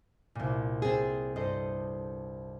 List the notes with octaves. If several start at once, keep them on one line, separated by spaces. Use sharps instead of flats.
C2 A#2
C4 G#4 A6
G2 A4 C5 D#5